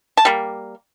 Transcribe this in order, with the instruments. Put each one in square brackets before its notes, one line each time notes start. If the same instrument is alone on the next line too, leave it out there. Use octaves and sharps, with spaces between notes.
[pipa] A5
G3 A#3